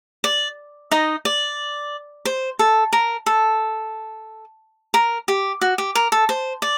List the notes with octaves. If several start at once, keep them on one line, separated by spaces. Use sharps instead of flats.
D5
D#4 D#5
D5
C5
A4
A#4
A4
A#4
G4
F#4
G4
A#4
A4
C5
D5